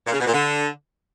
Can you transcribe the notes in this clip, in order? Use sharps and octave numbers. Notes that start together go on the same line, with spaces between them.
A#2
C#3
B2
A#2
D3